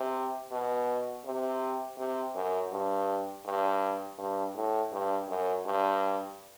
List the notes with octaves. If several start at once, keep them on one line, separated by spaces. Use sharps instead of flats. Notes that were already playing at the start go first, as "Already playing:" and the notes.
Already playing: C3
B2
C3
C3
F#2
G2
G2
G2
A2
G2
F#2
G2